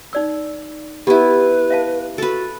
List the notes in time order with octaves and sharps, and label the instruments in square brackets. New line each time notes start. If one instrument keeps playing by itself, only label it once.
[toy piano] D#4 D5 E6
[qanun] B3 E4 [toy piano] G4 A#5 [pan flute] B4
[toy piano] E5 F5 A5
[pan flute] F#4 [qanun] A4 B4